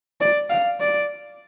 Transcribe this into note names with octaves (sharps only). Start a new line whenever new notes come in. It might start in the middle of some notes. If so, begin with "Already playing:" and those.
D5
F5
D5